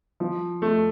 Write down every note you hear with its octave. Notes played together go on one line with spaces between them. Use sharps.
F3
A3